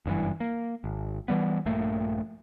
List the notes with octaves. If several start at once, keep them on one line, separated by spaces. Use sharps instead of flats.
F#1 G2 A#2 E3
A#3
G#1
E3 G3 B3
A#1 G2 A3 A#3